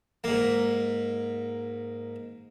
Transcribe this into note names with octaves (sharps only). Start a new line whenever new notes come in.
G#2 A#3